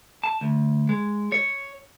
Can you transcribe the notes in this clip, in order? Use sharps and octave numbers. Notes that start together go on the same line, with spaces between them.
A5
D2
G#3
C#5